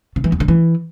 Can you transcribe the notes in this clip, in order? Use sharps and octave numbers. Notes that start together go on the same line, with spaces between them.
C#3
E3
E2
D3
E3